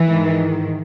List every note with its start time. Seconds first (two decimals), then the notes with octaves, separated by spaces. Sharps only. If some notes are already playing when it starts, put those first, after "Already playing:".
Already playing: E3
0.09 G#2 D#3